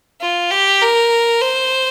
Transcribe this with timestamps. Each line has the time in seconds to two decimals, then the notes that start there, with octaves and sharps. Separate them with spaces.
0.21 F4
0.51 G4
0.82 A#4
1.41 C5